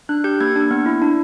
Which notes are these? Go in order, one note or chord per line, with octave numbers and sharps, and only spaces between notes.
D4 F#6
G4 G6
A#3 G#6
D4
B3
E4
D4